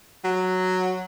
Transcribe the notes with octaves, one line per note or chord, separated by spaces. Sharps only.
F#3